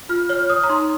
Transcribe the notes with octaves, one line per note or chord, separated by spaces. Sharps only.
F4 F6
C#5 F6
C#5 D#6
A#5
D#4 C6